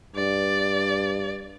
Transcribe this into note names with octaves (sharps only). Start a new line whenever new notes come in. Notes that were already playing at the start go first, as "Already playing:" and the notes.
G2 D5